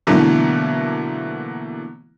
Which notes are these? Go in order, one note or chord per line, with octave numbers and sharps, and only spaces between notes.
B2 D3 E3 F#3 A3 A#3